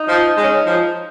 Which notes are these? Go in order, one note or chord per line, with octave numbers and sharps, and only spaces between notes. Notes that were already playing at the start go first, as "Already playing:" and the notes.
Already playing: D#4
F3
G#3
C#4
F3